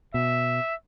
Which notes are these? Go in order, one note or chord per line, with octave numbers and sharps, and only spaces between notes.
B2 E5